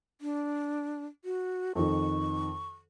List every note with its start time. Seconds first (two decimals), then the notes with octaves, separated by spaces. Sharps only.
0.21 D4
1.25 F#4
1.75 F2 D#3 C#6